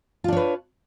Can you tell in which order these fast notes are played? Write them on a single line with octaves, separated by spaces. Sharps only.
F4 D4 C#5 B4